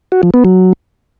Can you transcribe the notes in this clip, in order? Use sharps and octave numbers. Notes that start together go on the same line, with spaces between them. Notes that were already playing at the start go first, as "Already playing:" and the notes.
F#4
F3
B3
F#3